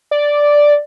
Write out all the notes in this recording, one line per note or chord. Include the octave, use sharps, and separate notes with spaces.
D5